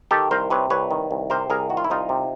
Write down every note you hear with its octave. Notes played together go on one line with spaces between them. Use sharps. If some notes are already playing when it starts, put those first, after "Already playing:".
D#3 G4 A4
C2 A#4 C5
C3 B4 C#5
C2 B4 C#5
D#3
C2
C3 A#4 C5
C2 G#4 A#4
D#3 F#4
F4
E4
C2 D#4 F4
C3